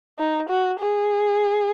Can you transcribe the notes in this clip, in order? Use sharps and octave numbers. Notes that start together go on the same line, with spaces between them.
D#4
F#4
G#4